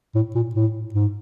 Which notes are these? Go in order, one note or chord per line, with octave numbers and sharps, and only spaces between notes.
A2
A#2
A2
G#2